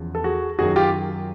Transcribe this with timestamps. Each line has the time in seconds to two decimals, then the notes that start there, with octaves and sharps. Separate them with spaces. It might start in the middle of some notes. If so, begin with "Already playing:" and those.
Already playing: E2 C#3 F3
0.15 A4
0.24 F#4 G#4
0.59 F#2 D#3 F#3 F#4 G#4
0.76 F4 G4